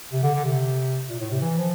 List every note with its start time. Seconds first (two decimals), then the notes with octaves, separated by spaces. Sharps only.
0.12 C3
0.23 D3
0.34 D3
0.45 C3
1.09 A#2
1.19 A2
1.31 C3
1.41 E3
1.58 F3